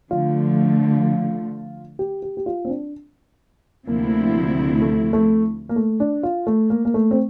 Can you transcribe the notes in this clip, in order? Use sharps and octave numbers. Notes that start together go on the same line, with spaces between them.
D3 F3 A3 F4
G4
G4
G4
F4
C4
D4
D2 C3 F3 A#3 C4 E4
A3
A3
A#3
A3
D4
F4
A3
A#3
A#3
A3
C4